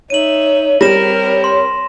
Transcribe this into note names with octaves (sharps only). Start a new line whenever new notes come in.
D#4 C#5 E5 D#7 F#7
G3 C4 A#4 C#5 A#6 E7
C6